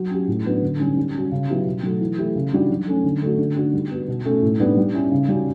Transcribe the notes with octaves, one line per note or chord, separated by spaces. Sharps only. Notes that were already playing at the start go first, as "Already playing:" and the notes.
Already playing: F#3
C#4 G4
A2
F#3 B3 D4
D3
G3 C#4
G3
C#4 F#4
C#3
F#3 B3 E4 G4
B2
F#3 A3
E3
A3 E4 G4
C#3
E3 G3 D4 F#4
F#3
A3 C#4
D3
A3 D4 F#4
D3
A3 D4 F#4
G3
B3 F#4
B2
A3 C#4
A2
G3 B3 D4
G3
C#4 E4
C#3
G3 C#4 F#4